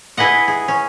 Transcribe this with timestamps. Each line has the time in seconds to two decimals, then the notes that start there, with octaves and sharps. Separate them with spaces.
0.17 E4 G#4 B4 D#5 F#5
0.48 G#4
0.68 C#4